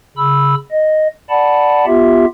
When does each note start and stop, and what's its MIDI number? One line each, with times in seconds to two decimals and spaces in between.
0.17 0.55 49
0.17 0.55 83
0.17 0.55 88
0.71 1.07 75
1.30 1.85 74
1.30 1.85 78
1.30 1.85 81
1.30 1.85 83
1.86 2.25 59
1.86 2.25 65
1.86 2.25 67
1.86 2.25 76